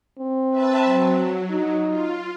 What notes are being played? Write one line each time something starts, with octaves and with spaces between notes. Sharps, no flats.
C4
B4 E5 A5
F#3
D#4
F4